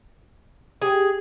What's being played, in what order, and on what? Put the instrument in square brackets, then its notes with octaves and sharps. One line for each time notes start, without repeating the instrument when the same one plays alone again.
[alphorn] G4 [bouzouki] G#4